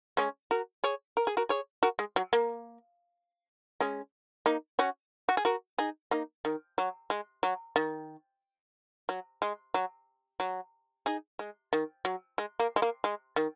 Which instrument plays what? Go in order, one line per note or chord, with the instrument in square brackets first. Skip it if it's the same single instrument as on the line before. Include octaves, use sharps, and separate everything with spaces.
[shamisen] G#3 C#4
F#4 A#4
G#4 C#5
A#4
G#4
F#4 A#4
G#4 C#5
F#4 A#4
G#3
F#3
A#3
G#3 C#4
A#3 D#4
C#4 F#4
F#4
G#4
F#4 A#4
D#4 G#4
A#3 D#4
D#3
F#3
G#3
F#3
D#3
F#3
G#3
F#3
F#3
D#4 G#4
G#3
D#3
F#3
G#3
A#3
G#3
A#3
G#3
D#3